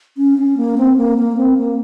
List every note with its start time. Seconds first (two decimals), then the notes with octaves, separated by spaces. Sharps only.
0.17 C#4
0.38 C#4
0.57 A#3
0.78 C4
0.97 A#3
1.18 A#3
1.37 C4
1.57 A#3